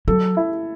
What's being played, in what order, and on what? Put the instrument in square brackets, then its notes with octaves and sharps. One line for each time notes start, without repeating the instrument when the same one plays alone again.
[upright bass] F#3 [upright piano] A4
[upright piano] E4